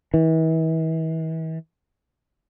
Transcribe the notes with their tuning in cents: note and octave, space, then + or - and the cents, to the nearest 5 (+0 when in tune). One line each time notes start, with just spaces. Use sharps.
E3 -40